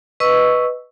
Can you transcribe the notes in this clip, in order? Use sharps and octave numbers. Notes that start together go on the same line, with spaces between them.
B4 D#5 C#6 E6